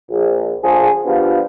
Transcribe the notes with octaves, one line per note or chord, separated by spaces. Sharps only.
A#1
D3 F3 G#4
F3 B3 D4 F4 G4